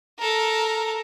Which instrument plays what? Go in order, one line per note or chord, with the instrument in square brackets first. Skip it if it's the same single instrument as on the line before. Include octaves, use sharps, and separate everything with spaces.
[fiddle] A4 A#4